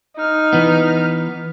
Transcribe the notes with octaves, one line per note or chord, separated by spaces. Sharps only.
D#4 F6
E3 B3